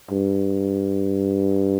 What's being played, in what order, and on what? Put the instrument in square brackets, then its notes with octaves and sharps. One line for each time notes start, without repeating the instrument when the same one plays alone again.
[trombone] G2